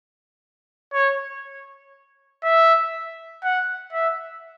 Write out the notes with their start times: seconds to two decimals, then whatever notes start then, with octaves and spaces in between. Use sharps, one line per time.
0.94 C#5
2.44 E5
3.44 F#5
3.93 E5